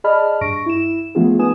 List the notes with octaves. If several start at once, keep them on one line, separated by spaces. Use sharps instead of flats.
G#4 D5 D#5 A5 B5 F6
G2 C#6 A#6 D7
E4 E7
F3 A3 B3 C#4 F4 G#4
B3 D#4 B4 G#5 D#6 E7